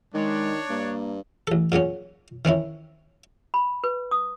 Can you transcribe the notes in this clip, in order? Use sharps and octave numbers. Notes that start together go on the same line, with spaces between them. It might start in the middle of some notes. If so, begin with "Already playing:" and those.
D#3 G#3 D4 C#5
G2 A#3
A1 A4
A#2 C#3 F#3 C#4
D#3 C4 C#4 E4
B5
B4
D#6